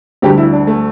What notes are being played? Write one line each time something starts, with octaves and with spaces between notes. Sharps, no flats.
D2 D3 G3 G4
E4
D4
A3